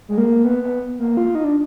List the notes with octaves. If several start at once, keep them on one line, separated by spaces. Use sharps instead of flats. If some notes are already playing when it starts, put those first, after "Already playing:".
G#3
A#3
B3
B3
A#3
F4
D#4
D4